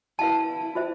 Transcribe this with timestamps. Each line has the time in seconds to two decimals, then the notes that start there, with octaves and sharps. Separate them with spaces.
0.19 E4 B4 F5 A5
0.47 E4
0.75 F4 C5 E5